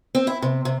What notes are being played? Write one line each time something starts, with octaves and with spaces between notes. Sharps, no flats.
C4
E4
C3
C3